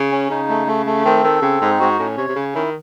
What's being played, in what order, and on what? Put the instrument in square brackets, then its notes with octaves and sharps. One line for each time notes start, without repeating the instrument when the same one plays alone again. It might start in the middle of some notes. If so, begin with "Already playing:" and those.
Already playing: [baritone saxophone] C#3
[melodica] C#4
[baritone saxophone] C#3 [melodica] D#4
[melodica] A3
A3
A3
[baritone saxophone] D#3 [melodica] C4
[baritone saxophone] D#3 [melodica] A4
[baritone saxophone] C#3 [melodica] C4
[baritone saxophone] G#2 [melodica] D#4
[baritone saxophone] G#2 [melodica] F#4
[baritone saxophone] A2 [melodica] C#4
[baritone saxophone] C3 [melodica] C#5
[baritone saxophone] C3
[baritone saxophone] C#3 [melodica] C#4
[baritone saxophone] D#3 [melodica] E4